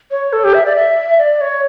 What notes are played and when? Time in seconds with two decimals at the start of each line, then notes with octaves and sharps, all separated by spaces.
0.11 C#5
0.33 A4
0.44 G4
0.54 E5
0.66 D5
0.76 E5
1.18 D5
1.41 C#5